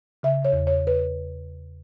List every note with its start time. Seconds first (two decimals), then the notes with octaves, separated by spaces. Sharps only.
0.23 C#3 E5
0.45 C#5
0.52 E2
0.67 C#5
0.87 B4